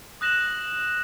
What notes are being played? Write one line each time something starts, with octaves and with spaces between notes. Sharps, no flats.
D#6 F#6 A#6 E7 F#7